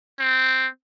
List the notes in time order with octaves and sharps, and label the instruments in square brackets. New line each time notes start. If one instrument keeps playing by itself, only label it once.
[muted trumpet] C4